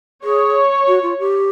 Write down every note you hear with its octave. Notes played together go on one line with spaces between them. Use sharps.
G#4 C#5
F#4
F4
G4